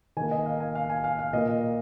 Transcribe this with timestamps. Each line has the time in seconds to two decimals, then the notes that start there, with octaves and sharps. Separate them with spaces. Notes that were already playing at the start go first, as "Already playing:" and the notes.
0.17 D#3 A#3 G#5
0.31 D#5
0.46 F5
0.60 G#5
0.75 F5
0.90 G#5
1.04 F5
1.19 F5
1.33 A#2 A#3 D#5